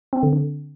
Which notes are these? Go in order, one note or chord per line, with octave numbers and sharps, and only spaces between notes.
C4
D3
D3